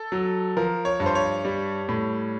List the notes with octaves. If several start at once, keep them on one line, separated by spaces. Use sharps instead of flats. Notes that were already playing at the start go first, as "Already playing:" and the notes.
Already playing: A4
F#3
F3 A#4
C#5
G2
C5
C#5
G3
A2